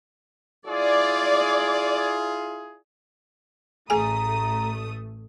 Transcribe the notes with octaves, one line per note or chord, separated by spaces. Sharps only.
E4 F4 G#4 D5
A1 A3 G#4 G#5 A#5 D#6